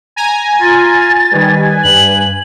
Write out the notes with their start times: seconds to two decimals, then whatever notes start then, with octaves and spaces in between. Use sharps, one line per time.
0.16 G#5 A#5
0.61 F4 A6
1.31 D#3 G3 B4 G#5
1.84 G2 F#7